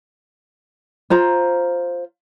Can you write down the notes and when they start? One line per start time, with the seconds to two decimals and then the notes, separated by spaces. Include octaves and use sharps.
1.10 F4 C5 A#5